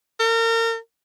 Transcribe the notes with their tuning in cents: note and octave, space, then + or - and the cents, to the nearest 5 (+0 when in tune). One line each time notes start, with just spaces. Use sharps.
A#4 -35